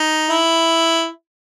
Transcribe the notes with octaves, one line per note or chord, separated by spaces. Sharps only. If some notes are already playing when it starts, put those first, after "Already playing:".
Already playing: D#4
E4